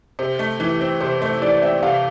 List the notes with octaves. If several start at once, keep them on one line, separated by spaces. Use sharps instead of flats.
C3 C5
A3
E3
C4
C3 C5
A3 C5
E3 D5
C4 E5
C3 F5